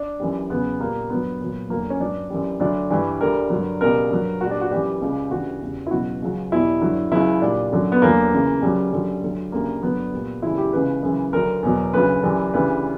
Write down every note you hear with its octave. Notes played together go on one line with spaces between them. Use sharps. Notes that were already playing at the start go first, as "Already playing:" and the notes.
Already playing: D4
F#2 E3 G3
E2 C#3 F#3 B3
A#2 G3 A#3
G2 F#3 B3
A#2 F#3
E2 D3 F#3 A#3
C#4
G2 F#3 D4
F#2 E3 G3
D2 D3 F#3 D4
G2 E3 G3
D2 D3 G3 A#4
G2 D3 F#3
C#2 B2 G3 A#4
G2 F#3
A#2 G3 F#4
D4
F#4
F#2 E3 G3 G4
C#2 C#3 G3
D2 C#3 E3 G3 F#4
E2 C#3 G3
E4
C#2 B2 F#3 F#4
C#2 C#3 F#3
E2 B2 G3 E4
G2 D3 F#3
C#2 C#3 F#3 E4
A#2 G3 D4
F#2 D3 F#3
B3
E2 D3 F#3 A#3
C#2 C#3 E3
F#2 C#3 F#3 G3
F#2 D3 F#3
D2 D3 F#3
D2 C#3 G3 A#3
G2 D3 F#3 B3
A#2 G3
F#2 C#3 E3 G3 E4
G4
C#2 C#3 E3 B4
F#2 C#3 E3
D2 D3 F#3 A#4
E2 B2 F#3
D2 C#3 F#3 B4
F#2 E3 G3
D2 C#3 E3 G3 B4